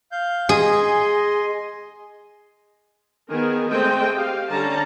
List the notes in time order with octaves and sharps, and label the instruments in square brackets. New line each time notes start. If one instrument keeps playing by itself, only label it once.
[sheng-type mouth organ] F5 G6
[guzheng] G#4 [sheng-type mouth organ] D#5 G#5 C6
[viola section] D#3 B3 G#4 A#4
G#3 A3 C4 D#5 G5
G4 F5
D3 G3 C#4 A5 A#5